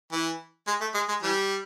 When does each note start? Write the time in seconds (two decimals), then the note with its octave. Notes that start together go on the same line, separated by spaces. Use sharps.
0.12 E3
0.67 G#3
0.81 A3
0.94 G#3
1.08 G#3
1.22 E3 G3